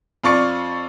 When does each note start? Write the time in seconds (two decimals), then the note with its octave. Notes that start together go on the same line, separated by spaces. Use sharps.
0.24 F2 F4 D5 C#6 A6 C#7